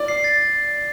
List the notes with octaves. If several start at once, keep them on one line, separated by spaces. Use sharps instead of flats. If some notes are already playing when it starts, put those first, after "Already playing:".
Already playing: D5
C7
A6